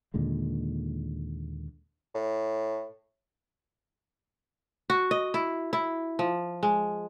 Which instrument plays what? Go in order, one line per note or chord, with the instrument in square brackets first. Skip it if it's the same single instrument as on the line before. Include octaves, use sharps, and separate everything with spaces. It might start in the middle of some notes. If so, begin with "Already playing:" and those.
[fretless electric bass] D#2 A#2 D3 G#3
[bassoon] A2
[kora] F#4
D#5
E4
E4
F3
G#3